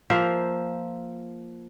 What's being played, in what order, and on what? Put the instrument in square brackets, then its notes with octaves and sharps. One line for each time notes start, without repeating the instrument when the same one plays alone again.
[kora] F3 A#3 C5 E5